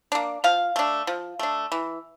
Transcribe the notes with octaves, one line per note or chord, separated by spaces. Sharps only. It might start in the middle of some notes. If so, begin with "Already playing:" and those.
A#3 D4
F3 F5
A3 D4
F3
A3 D4
E3